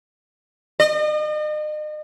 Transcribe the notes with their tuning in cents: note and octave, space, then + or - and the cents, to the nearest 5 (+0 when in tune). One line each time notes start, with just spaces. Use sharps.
D#5 -40